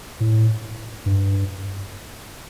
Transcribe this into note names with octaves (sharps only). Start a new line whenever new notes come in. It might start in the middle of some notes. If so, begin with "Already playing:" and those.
A2
G2